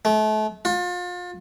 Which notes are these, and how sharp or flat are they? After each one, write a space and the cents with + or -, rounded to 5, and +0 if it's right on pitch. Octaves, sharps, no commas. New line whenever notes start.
A3 -35
F4 +35